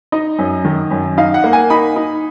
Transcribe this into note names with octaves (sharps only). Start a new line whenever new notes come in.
D#4 D#5
F#2
D#3
F#2
D#4 F5
F#5
A#3
G#5
D#4 B5
D#4